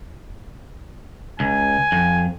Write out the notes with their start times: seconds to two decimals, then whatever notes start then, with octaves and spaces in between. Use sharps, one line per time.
1.40 C#2 G#5
1.92 F2